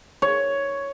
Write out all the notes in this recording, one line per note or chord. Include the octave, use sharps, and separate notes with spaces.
C#5